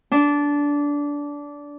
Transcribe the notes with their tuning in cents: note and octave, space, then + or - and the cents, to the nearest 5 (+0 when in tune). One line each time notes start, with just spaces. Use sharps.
D4 -20